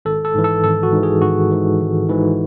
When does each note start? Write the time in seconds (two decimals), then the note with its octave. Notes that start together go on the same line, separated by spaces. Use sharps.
0.05 G#1 A4
0.25 A4
0.35 G#2 E3
0.44 A4
0.64 G#1 A4
0.83 F#4
0.93 G#2 E3
1.03 G#4
1.22 G#1 F#4
1.52 G#2 E3
1.81 G#1
2.09 G#2 E3